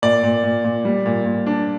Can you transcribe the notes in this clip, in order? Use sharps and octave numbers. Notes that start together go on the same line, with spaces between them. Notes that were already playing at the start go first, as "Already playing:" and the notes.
A#2 D5
A#2
A#2
A#2
G3
A#2
A#2
D4